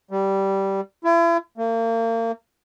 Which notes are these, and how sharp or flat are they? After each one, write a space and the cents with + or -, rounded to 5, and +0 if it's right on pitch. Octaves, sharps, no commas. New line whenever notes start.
G3 -10
E4 +40
A#3 -35